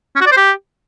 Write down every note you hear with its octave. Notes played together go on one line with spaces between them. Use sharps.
C#4
F#4
D5
C5
G4